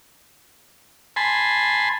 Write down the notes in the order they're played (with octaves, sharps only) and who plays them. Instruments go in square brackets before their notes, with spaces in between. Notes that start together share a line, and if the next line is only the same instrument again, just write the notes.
[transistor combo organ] G#5 A5 B5 C6